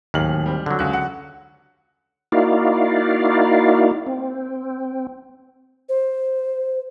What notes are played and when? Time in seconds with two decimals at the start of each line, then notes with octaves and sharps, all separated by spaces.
0.14 D1 D#2 F6 F#7
0.46 G3 C4
0.66 D3 F#3
0.79 C#2 F#6
0.93 F#5
2.32 A#3 D#4 E4 F#4 D5 F5
4.06 C4
5.89 C5